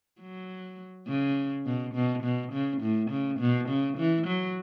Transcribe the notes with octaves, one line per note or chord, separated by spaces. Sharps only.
F#3
C#3
B2
B2
B2
C#3
A2
C#3
B2
C#3
E3
F#3